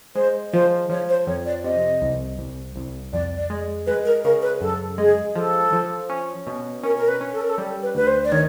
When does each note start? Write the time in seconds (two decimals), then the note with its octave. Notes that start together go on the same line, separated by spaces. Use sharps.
0.15 G#3 C5
0.53 F3 C5
0.90 F3 C#5
1.09 C5
1.27 F2 C#5
1.46 D5
1.64 C3 D#5
2.02 C2
2.38 C2
2.76 C2
3.13 F2 D5
3.37 D5
3.50 G#3
3.87 G#3 B4
4.05 A#4
4.24 C#3 A#4
4.42 B4
4.61 F#2 A4
4.98 G#3 G#4
5.35 F3 A4
5.72 F3
6.09 C#4
6.47 B2
6.83 C#4 A#4
6.98 A#4
7.08 B4
7.21 C#4
7.33 A4
7.41 A#4
7.49 A4
7.58 G3
7.82 B4
7.95 D2 B4
8.07 C5
8.25 D5
8.32 D#3 C#5